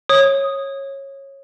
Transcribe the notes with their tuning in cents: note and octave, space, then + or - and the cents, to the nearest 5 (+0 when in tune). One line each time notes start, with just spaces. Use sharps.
C#5 -15 D#6 +0